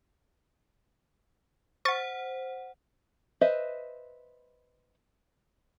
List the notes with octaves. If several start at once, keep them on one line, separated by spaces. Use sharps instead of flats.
C5 F#5 C#6 A6
B4 C5 D#5 E5